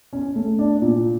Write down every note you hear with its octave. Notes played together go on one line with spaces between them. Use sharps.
C#4
A3
D4
A#2